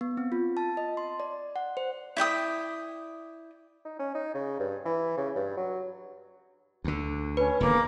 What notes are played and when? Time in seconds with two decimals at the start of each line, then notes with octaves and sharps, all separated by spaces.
0.01 B3
0.17 C4
0.32 F4
0.57 A5
0.77 D#5
0.97 C6
1.20 D5
1.56 F#5
1.77 C5
2.17 E4 D5 G5 D#6
3.85 D#4
3.99 C#4
4.15 D#4
4.34 C#3
4.60 G2
4.85 E3
5.17 C#3
5.36 G2
5.57 F#3
6.84 D2 D3
7.37 C#4 B4
7.60 E1 D3 D#3 A#3